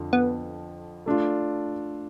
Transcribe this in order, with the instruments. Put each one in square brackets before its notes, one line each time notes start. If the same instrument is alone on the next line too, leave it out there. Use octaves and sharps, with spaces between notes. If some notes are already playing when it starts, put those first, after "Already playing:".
Already playing: [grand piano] F2 D3 F3
[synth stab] B3
[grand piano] A3 D4 F4